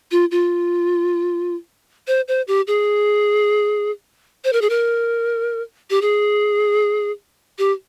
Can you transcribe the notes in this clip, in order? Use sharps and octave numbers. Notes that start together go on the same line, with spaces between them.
F4
F4
C5
C5
G4
G#4
C5
A#4
G#4
A#4
G4
G#4
G4